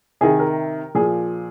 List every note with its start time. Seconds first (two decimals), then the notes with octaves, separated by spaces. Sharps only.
0.21 C3 D#3 G#4
0.39 A#4
0.95 A#2 F3 G#4